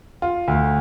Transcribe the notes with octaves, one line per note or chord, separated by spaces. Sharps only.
F4
D2